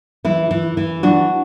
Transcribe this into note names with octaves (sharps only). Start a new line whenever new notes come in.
E3 E4
E3
E3
D4 F#4